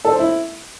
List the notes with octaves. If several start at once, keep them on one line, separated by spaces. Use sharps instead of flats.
A4
C5
E4